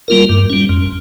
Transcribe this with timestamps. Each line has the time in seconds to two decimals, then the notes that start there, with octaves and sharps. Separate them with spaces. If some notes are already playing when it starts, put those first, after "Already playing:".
0.08 G3 A#3 F4 A#4
0.29 G2
0.50 G3 C#4
0.69 F2